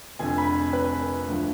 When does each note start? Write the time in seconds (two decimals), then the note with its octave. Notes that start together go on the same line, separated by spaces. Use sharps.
0.19 F1 F2 D3 G#5
0.38 B5
0.73 B4
1.01 A#4
1.28 D2 D3 F3